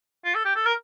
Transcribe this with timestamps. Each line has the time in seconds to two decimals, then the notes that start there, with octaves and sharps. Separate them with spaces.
0.25 F4
0.35 A4
0.45 G4
0.56 A4
0.66 A#4